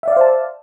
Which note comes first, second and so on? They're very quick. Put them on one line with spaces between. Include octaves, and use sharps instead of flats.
E5 D5 F5 C5 A5